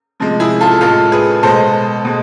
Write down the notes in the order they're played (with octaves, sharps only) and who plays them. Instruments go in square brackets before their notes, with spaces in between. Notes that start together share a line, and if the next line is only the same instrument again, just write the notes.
[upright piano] C3 F3 G#3
E4 G#4
F4 A4
A2 G#3 F4 A4
G#4 B4
B2 G#3 A4 C5
B2 G#3